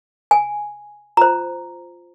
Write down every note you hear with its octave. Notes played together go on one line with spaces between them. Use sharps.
G#5
F4 C5 A#5